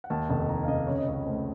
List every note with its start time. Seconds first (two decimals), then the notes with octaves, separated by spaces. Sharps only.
0.04 F#5
0.10 D#2 A5
0.30 F1 A5
0.49 D#3 A#5
0.64 F5
0.68 F1 D#5
0.87 C#3 C#5
0.98 D#5
1.07 C#2 C#5
1.26 A3 C5